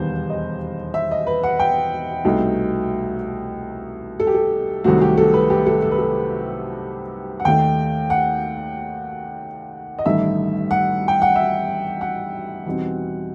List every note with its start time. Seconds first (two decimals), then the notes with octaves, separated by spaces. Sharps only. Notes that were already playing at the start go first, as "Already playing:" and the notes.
Already playing: E1 D#2 D#3 G3 B3 C5
0.30 D#5
0.94 E5
1.11 D#5
1.27 B4
1.43 F#5
1.59 G5
2.25 C2 B2 A3 D#4
4.20 A4
4.27 G4
4.34 A4
4.84 C2 C3 D#3 F#3 A3 F#4
5.01 G4
5.18 A4
5.34 B4
5.50 G4
5.66 A4
5.82 A4
5.91 B4
5.98 A4
7.40 F#5
7.45 D#2 D#3 A3 D#4 G5
8.10 F#5
9.99 D#5
10.05 A1 G2 D#3 A3 D#4 E5
10.71 F#5
11.08 G5
11.22 F#5
11.36 E5
12.01 F#5
12.66 E2 B2 G3 C4 D#4